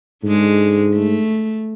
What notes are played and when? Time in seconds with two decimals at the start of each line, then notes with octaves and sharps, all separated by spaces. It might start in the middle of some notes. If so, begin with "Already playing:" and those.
0.23 G#2 D3 G#3
0.94 A3